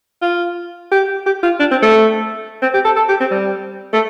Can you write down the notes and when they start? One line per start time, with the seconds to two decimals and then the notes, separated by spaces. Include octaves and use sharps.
0.22 F4
0.92 G4
1.26 G4
1.43 F4
1.60 D4
1.71 C4
1.82 A3
2.62 C4
2.74 G4
2.85 A4
2.96 A4
3.09 G4
3.20 C4
3.31 G3
3.93 A3